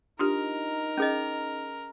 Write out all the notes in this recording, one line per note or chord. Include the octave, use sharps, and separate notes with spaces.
D4 D#4 F4 G4 A#4
C#4 G#4 D#5